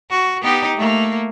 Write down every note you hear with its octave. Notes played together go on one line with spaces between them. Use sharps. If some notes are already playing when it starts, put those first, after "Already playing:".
F#4
B3 D#4 G4
A3 A#3